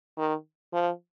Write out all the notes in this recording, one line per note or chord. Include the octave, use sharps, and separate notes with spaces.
D#3
F3